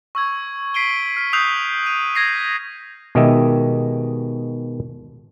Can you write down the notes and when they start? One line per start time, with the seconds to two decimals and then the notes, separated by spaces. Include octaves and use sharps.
0.15 C#6 E6 G#6
0.74 B6 C7 D7 D#7 G7
1.16 F6 B6 C7
1.33 D#6 E6 F#6 G6 C7 F7
1.86 D#7
2.15 G#6 A#6 C7
3.15 B2 D#3 G#3 G4 D#5 E5